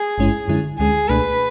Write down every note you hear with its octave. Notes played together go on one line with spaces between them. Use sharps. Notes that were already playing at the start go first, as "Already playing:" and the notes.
Already playing: G#4
A1 G#2 G#3 C#4 E4
F#2 D3 G#3 C#4 E4
D2 D3 G#3 C#4 G#4
C#2 B2 A3 D4 B4